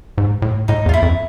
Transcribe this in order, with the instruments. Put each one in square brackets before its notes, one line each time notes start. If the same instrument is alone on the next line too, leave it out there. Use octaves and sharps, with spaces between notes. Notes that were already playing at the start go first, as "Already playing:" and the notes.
[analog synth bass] G#2
A2
[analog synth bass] A2 [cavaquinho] D#4
[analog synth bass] E2
[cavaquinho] F4
E4
[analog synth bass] F2